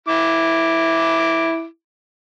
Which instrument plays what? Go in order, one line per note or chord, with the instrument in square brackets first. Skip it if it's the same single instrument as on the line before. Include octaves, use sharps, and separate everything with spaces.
[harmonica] E4 D6